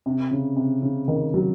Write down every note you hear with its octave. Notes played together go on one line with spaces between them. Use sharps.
C3
C#3
C3
C#3
D#3
F#3